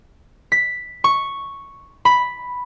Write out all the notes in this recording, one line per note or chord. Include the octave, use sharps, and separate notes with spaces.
B6
C#6
B5